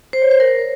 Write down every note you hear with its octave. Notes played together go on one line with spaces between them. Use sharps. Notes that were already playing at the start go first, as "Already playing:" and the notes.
C5
C#5
C5
A#4